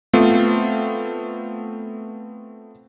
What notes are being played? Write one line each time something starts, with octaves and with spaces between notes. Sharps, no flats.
A3 B3 C4 F4